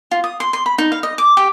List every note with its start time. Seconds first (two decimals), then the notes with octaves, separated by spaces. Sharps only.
0.11 F4
0.24 D#6
0.40 C6
0.53 C6
0.66 B5
0.78 D#4
0.92 F5
1.03 D#5
1.18 D6
1.37 G4